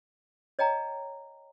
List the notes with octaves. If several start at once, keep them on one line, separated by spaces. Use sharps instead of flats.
C#5 D#5 G5 A#5